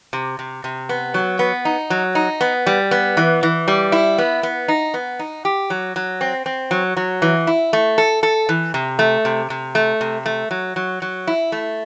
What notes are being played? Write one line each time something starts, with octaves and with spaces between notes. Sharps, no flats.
C3
C3
C3
B3
F#3
B3
D#4
F#3
D#4
B3
G3
B3
E3
E3
G3
E4
B3
B3
D#4
B3
D#4
G4
F#3
F#3
C4
C4
F#3
F#3
E3
E4
A3
A4
A4
E3
C3
A3
C3
C3
A3
C3
A3
F#3
F#3
F#3
E4
A3